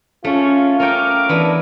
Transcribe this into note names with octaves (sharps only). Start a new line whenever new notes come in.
A3 C#4 F4
C#4 A#4 C#5 G5 D6
E3 B3 D4 G#5